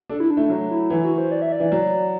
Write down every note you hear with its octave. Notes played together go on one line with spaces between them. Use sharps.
D4 A4
E4
D4
A3
F#3
E4
E3 E4
F#4
C5
D5
E5
D5
E3
F#3